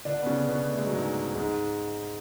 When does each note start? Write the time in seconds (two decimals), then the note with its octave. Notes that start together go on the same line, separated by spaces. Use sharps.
0.05 D3 D4
0.22 B3
0.26 C#3 C#4
0.48 B2 B3
0.70 A3
0.78 G#3
0.87 F#3
0.95 G#2 G#3
1.35 G#2 G#3